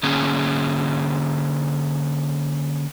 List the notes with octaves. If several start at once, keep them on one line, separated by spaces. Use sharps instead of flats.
D3 A#3 C#4 G#4